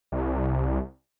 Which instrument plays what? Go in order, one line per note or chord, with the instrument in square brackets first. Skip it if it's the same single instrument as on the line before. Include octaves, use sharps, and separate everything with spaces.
[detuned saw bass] C2